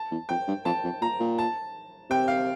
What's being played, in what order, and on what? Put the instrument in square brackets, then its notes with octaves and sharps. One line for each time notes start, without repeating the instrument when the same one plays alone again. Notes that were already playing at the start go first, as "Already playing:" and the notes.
Already playing: [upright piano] A5
[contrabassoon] E2
[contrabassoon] F2 [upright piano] G5
[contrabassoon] G2
[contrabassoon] F2 [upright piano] A5
[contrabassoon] F2
[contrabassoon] A#2 [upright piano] A#5
[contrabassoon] A#2
[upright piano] A5
[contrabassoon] C3 [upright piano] G5
[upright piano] F5